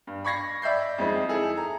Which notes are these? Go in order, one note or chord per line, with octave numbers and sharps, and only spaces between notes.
G2
B5 C#6 G#6 A#6 C7
D5 E5 B5 G6 C7
F2 G#3 C4 D#4
E4 G#4 A4
A#5